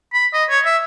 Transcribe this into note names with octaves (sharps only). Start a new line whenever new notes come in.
B5
D#5
C#5
E5